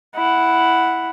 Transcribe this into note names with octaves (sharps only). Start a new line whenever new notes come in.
E4 F#5